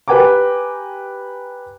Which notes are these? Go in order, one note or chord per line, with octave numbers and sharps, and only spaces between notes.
G4 B4 G5 G#5 A#5 D6